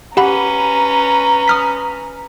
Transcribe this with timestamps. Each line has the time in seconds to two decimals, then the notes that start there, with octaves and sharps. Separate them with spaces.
0.17 C#4 G4 B4 F#5 A#5 B5
1.48 D#6 F6 B6